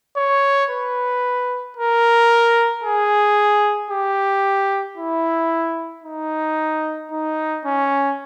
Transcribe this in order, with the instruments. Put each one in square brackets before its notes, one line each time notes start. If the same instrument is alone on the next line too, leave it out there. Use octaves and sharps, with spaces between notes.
[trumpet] C#5
B4
A#4
G#4
G4
E4
D#4
D#4
C#4